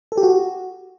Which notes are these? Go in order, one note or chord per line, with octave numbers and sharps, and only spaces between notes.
A4
G4
F#4